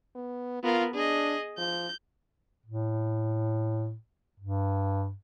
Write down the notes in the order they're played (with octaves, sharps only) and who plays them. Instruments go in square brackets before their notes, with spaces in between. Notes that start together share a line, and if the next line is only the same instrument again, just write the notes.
[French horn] B3
[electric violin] B3 A#4 [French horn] F4
[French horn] D4 [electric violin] G#4 D#5
[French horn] F3 [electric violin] G6
[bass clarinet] A2
G2